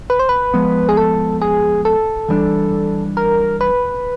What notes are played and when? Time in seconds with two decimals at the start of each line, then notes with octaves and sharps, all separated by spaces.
0.10 B4
0.19 C5
0.29 B4
0.54 F3 G#3 B3
0.89 G#4
0.97 A4
1.42 G#4
1.85 A4
2.29 E3 G3 B3 D4
3.17 A#4
3.61 B4